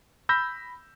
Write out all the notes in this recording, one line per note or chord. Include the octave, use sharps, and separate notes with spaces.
B5 E6 G6 A#6